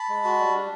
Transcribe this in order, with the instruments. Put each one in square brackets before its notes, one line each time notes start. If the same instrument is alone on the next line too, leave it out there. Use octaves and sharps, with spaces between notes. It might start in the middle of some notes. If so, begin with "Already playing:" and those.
Already playing: [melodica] A5 B5
G#3
F#4
G3
D4